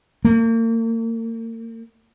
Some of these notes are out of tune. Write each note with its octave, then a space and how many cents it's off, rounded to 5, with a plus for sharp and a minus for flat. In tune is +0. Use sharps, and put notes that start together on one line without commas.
A#3 -40